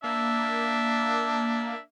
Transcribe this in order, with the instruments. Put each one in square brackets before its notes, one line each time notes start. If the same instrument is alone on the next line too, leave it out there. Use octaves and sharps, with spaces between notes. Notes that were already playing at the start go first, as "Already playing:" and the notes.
[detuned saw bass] A#3 [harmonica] D4 E5